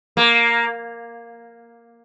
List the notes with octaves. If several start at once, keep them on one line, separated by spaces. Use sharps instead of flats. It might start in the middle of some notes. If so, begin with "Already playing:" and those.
A#3